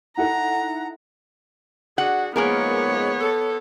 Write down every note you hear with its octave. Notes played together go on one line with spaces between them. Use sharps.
D#4 E4 A4 F#5 A#5
D4 F#4 G#4 F#5
G#2 F3 G#3 A#3 B3 G#4 A#4 C#5
A4